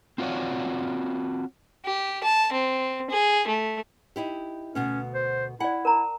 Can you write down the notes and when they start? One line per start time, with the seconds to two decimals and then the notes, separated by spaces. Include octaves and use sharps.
0.18 C4 F4 F#4 G#4 C#5 D5
1.85 G4
2.24 A5
2.52 C4
3.10 G#4
3.47 A3
4.16 D#4 E4 G4
4.75 D2 B2 B3 C#4
5.14 C5
5.60 E4 D5 F#5 G#5
5.85 A#4 A5 A#5